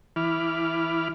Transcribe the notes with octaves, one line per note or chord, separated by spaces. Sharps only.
E3 E4 B5 D6 F6